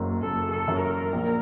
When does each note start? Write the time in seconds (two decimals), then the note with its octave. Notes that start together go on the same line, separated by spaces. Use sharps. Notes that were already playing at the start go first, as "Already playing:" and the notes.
Already playing: F#1 F#2 F#3
0.22 F#1 A4
0.52 A4
0.68 F#2 F#3
0.83 A#4
1.13 A#1